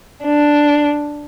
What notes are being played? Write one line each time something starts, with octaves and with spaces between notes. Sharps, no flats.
D4